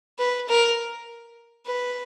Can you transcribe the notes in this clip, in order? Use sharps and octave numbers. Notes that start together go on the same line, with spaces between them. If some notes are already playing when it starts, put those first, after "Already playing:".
B4
A#4
B4